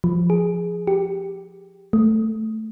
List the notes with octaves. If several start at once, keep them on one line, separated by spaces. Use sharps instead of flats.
F3
G#4
G4
A3